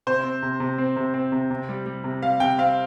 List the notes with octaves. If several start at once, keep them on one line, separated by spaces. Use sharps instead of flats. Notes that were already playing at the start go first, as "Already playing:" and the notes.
C3 C5
C4
C3
C3
C4
C3
C4
C3
C3
G3
G3
C3
G3 F5
C3 G5
C4 F5